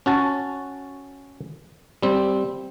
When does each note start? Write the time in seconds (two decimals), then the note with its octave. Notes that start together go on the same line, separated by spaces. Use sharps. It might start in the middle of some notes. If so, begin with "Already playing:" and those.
0.06 C#4 F#4 A5
2.03 G3 C4